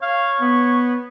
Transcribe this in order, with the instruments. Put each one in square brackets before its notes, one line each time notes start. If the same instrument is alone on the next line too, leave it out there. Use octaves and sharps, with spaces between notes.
[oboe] C#5 [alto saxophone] F5
[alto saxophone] B3